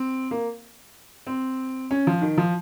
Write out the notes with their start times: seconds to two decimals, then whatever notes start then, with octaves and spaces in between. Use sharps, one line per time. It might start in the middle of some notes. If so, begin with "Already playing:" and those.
Already playing: C4
0.31 A#3
1.27 C4
1.91 C#4
2.07 F3
2.22 D#3
2.38 F3